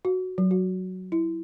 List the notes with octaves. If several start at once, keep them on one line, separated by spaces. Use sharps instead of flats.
F#4
F#3
F#4
E4